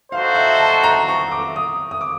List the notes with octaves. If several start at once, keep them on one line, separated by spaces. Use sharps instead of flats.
D#4 F#4 A4 C5 F5
E5
A5
A#5
C#6
D6
D#6
D#6
D6